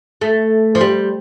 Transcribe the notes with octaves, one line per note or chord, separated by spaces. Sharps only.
A3
F3
G3